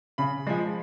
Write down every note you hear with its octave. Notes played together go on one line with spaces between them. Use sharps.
C#3 B5
F3 G#3